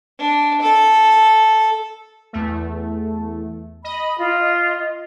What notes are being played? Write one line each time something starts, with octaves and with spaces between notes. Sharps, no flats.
D4
A4
E2 A3
D#5 B5
F4